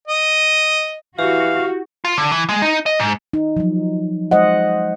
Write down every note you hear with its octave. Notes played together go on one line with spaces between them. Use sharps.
D#5
E3 E4 F#4 G4 F5
F4
D3
E3
G#3
D#4
D#5
G#2
D#4
F3 F#3
G#3 C5 D#5 F#5